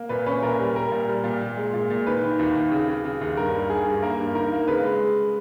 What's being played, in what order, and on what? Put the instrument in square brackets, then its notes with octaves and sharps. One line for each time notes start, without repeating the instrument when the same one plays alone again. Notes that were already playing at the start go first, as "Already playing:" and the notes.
Already playing: [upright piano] A#3
A#2 B4
C#4 B4
A#2 A#4
G3
G3 A#4
A#2
G3
A#2
A#2
G#3
A#2
A#2
D#3 B4
D#3
D#2
D#2
C#3
C#3
C#3
D#2
G2 A#4
G2
G2 G#4
G2
A#3 A#4
G2
D#3 A#4
A#3
C#3 B4
G#3